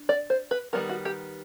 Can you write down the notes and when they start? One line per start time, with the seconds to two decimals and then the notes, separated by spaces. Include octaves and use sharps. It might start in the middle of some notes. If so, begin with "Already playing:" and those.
Already playing: D4
0.09 D5
0.30 C5
0.51 B4
0.73 D#3 G3 B3 A#4
0.89 F#4
1.05 G4